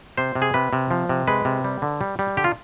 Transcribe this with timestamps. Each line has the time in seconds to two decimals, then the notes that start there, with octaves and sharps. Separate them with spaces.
0.17 C3 C5
0.35 C3
0.42 G#4
0.54 C3 B4
0.73 C3
0.91 F3
1.09 C3
1.28 G#3 B4
1.45 C3
1.64 G3
1.82 D3
2.01 G3
2.19 G3
2.37 D3 G4
2.44 F4